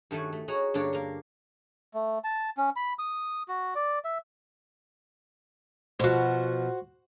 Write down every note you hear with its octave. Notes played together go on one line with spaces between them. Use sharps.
G2 D#3 A3 F#4 G#5
A3
F#4 G#4 C#5 D#5 A#5
G2 D3 A#3 D4 C#5 D5
A#3 A#4
A3
A5
C#4
B5
D#6
F#4
D5
E5
B2 F3 F#4 C5